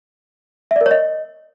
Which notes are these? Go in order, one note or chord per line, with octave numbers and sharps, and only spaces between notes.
E5
D5
A#4
C#5
D#5